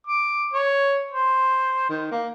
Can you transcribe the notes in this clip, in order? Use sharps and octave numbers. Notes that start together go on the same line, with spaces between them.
D6
C#5
C5
D#3
A#3